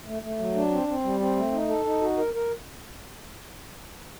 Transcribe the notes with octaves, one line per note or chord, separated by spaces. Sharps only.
A3
A3
F#3
D4
C4
C4
G3
C4
A3
D#4
A4
D#4
F#4
A#4
A#4